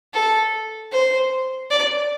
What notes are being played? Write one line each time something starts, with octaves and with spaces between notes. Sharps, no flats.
A4
C5
D5